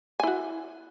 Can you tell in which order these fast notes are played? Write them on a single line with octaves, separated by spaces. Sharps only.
G#5 E4 F#4